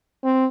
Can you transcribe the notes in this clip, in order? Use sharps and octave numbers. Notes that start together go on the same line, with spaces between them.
C4